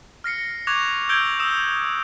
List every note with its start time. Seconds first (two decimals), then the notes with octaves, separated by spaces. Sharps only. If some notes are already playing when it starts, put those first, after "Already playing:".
0.24 F6 A#6 C7 C#7
0.67 C#6 D6 F#6 G#6 A#6 F7
1.09 E6 G6 G#6 D7 G7
1.40 D#6 E6 E7